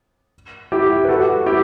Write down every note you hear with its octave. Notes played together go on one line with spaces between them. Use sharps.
E4 G4
B4
F#4 A4
E4 G4